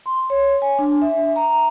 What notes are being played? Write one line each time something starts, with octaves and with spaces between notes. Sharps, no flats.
C6
C#5
G#5
D4
E5
A#5